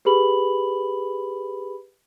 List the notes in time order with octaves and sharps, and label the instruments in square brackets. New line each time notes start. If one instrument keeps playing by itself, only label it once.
[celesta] G4 G#4 B4 B5 F#7